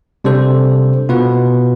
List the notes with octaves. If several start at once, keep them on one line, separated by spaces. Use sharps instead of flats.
C3 G3 D4 A4 C5
B2 B3 F4 B4